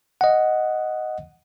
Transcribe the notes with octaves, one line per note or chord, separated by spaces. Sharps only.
D#5 F#5